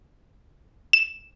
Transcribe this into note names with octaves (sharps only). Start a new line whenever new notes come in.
E7